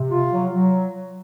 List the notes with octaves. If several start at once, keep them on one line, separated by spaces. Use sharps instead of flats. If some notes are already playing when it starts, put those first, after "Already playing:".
Already playing: C3
F4
F#3
F#3